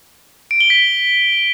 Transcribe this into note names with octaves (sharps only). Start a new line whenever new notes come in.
D7
G7
B6